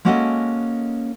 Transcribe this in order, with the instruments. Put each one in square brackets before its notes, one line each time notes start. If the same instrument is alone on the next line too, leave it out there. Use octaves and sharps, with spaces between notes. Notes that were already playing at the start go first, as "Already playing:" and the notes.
[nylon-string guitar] G#3 A#3 C#4 F#4 A4 D#5